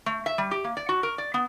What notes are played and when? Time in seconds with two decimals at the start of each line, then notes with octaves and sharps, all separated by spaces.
0.06 A3
0.26 E5
0.38 G3
0.51 G4
0.64 A#3
0.77 D5
0.89 F#4
1.03 A#4
1.18 D5
1.34 B3